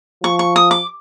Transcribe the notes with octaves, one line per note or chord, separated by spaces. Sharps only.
F3 C#6
C#6
D#6
D6